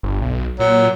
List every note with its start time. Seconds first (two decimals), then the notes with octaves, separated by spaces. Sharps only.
0.03 G1
0.21 B1
0.60 A#2 F#3